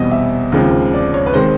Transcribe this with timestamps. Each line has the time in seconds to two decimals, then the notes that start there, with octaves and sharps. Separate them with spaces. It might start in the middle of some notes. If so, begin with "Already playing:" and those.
Already playing: E2 B2 G3 C4 D#5
0.11 E5
0.52 D#2 C#3 F3 G#3 C4
0.94 D5
1.14 C#5
1.26 B4
1.34 D#3 G#3 C4 C5